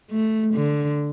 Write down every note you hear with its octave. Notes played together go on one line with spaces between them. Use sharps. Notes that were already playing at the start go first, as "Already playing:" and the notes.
A3
D3